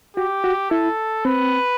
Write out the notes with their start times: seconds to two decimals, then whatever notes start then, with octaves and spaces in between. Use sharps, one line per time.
0.17 F#4 G4
0.44 F#4
0.71 E4 A4
1.25 C4 B4